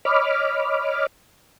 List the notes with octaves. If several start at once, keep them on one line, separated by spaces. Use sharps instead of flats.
C#5 D#5 B5 D6 F6